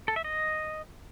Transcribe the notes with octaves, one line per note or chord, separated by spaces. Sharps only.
A4
E5
D#5